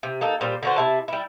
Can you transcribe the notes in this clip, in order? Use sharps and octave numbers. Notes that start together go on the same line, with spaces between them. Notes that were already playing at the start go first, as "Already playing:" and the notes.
C3
A#3 D#4 A4
A#2 G3 C5
D3 F#4 C5
C3 E4 A5
G3 E4